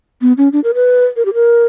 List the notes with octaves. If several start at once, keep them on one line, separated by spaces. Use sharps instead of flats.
B3
C#4
D4
A#4
B4
A#4
G4
A#4